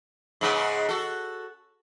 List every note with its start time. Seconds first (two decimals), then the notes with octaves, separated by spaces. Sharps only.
0.41 G#2 C#3 B3
0.89 F#4 A4